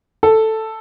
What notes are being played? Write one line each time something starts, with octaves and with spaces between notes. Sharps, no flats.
A4